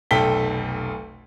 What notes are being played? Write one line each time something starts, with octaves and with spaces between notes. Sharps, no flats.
F1 B1 A4 G5 B6 G7